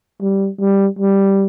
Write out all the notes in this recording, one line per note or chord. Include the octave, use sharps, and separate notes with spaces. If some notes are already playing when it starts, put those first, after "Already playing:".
G3
G3
G3